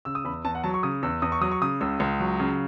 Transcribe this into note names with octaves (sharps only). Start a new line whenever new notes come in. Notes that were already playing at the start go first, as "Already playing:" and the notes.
C#3 E6
D#6
E2 B5
E2 A5
F#5
F#3 A5
C#6
C#3 D#6
E2 E6
E2 D#6
C#6
F#3 D#6
C#6
C#3 D#6
C#2 E6
C#2
F#3
C#3